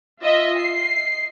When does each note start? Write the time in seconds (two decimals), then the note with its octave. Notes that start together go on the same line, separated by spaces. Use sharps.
0.22 F4 D#5 E5
0.60 C7